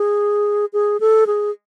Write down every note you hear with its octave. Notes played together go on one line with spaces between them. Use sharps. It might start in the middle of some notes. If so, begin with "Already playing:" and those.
Already playing: G#4
G#4
A4
G#4